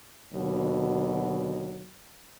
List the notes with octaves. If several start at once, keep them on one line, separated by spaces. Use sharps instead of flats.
D#2 B2 D3 F#3